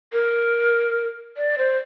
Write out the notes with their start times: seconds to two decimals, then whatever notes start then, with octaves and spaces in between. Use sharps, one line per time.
0.13 A#4
1.37 D5
1.58 C5